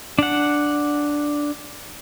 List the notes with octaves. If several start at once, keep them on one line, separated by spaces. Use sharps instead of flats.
D4 F#5